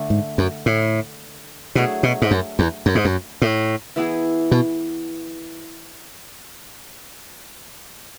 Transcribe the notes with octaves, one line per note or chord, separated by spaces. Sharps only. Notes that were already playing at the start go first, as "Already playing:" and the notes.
Already playing: D3 A3 D4
G#2
F#2
A2
B2 F#3 A3 D4 G#4
B2
G#2
F#2
E2
F#2
G#2
F#2
A2
E3 B3 E4 G#4
B2